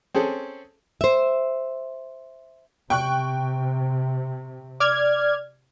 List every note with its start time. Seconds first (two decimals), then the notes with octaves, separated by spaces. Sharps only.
0.15 C4 C#4 G#4 A4
1.01 C5 E5
2.90 C3 G5 C#6 F#6
4.80 D5 F6 G#6